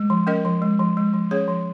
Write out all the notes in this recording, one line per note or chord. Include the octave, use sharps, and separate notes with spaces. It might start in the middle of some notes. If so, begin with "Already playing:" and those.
Already playing: G#3
F3
C#4 A#4 D#5
F3
G#3
F3
G#3
F3
C#4 G#4 C#5
F3